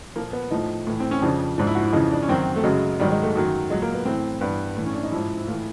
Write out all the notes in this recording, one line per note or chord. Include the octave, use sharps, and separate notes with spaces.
A#2 F3 A#3
B3
A2 F3 D#4
A2 E3
C4
C#4
F2 C#3 F3 D4
G#2 F3 D4
E4
F#4
E4
F2 C#3 E3 D#4
D4
C#4
F#2 D#3 F#3 C4
A3
F#2 C#3 F#3 G#3
G#2 D#3 F#3 G3
G#3
A3
F#2 D#3 F#3
A#2 F#3 G#3
A#3
B3
A2 E3 C4
G2 E3 B3
A2 E3
C#4
D4
D#4
G#2 F3 E4
E4
A2 E3 F4